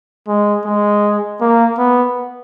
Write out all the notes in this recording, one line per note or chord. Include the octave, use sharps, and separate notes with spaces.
G#3
G#3
A#3
B3